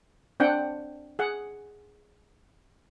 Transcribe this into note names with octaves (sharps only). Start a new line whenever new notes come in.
C4 D4 F#5 G5
G#4 F#5